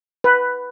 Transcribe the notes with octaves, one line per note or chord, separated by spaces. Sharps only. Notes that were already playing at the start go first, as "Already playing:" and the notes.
B4